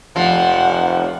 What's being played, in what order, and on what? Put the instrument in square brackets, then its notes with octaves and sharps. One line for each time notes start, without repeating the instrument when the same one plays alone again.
[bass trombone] F1 [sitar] F3 [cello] F#5